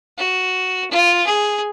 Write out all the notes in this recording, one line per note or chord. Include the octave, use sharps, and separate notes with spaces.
F#4
F4
G#4